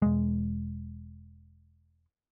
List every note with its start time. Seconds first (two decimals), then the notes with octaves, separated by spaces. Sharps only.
0.02 E1 G#3